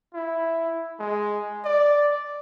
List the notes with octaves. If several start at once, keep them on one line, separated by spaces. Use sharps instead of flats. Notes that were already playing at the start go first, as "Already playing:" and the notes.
E4
G#3
D5